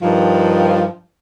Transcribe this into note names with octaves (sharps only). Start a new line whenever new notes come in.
G2 D#3 F3